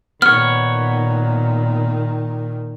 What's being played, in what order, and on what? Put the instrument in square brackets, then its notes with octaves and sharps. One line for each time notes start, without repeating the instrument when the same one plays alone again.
[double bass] A#2 D#3 [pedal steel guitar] B3 C#5 [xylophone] F6